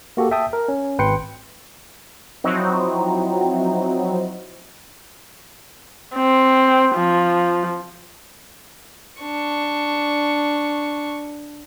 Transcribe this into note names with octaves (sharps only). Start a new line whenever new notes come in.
A#3 F#4 G4 A4
E5 G5 A5 D#6
A#4
C#4
G#1 B4 G5 C6 C#7
F3 F#3 C4 D#4 E4 F#4
C4
F3
D4 C#6